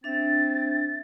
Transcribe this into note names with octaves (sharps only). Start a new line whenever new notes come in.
C4 D4 E5 A6